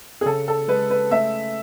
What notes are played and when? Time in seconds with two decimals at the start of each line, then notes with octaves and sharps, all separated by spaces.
0.21 G#4
0.26 C#3 A4
0.48 A4
0.68 G#3 B4
0.90 B4
1.11 A3 E5